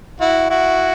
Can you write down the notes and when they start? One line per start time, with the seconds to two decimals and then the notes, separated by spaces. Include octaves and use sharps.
0.20 E4 F#4
0.50 E4 F#4